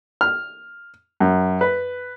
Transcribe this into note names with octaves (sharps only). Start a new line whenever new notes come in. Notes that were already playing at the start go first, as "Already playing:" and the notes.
F6
F#2
B4